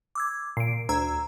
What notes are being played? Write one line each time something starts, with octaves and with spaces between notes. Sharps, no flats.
D6 E6 G#6
A#2 C7 D7
D2 A#5 E6 G#6